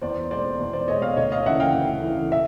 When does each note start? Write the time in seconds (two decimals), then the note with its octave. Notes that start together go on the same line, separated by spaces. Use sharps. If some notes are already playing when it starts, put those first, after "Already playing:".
0.01 E2 C5 D5
0.31 B2 G#3 C5 D5
0.60 E2
0.73 C5 D5
0.88 B2 G#3 C#5 D#5
1.02 D#5 F5
1.16 D2 C#5 D#5
1.32 D#5 F5
1.46 C#3 E3 E5 F#5
1.60 F5 G5
1.74 D2
2.03 C#3 E3
2.32 E5